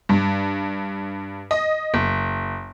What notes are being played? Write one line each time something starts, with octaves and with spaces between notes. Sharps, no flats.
G2
D#5
F#1